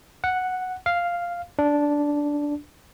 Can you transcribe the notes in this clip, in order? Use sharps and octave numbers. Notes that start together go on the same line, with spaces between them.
F#5
F5
D4